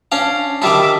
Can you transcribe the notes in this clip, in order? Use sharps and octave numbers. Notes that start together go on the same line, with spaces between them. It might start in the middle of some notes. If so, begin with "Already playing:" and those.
C#4 D4 F5
D#3 G3 D4 E5 D6